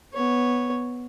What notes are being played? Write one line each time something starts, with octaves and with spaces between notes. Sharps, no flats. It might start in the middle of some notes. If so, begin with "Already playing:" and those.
B3 C#5